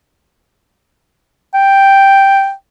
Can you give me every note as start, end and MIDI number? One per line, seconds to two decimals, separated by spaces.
1.54 2.52 79